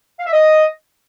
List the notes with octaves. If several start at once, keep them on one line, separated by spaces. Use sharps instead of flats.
F5
E5
D#5